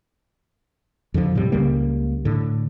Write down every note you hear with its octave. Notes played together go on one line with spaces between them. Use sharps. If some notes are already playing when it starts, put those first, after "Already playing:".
F2 D3 D#3 F3
A2 C3 G3
C#2 C#3 G3 A#3
A2 D3